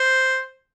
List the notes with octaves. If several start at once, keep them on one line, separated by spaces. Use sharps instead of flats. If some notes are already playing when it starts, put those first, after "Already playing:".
Already playing: C5